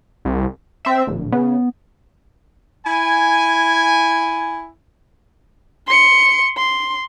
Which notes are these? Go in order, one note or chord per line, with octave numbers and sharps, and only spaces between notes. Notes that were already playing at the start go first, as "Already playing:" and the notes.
C2
C4 E5
D1 A#1
C#3 B3
E4 G#5
C6 C#7
C6